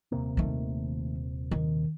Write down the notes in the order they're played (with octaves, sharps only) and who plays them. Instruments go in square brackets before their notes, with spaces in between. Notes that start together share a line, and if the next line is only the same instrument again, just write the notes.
[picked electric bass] D#1 C3 A#3
[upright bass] D#3 A3
D#3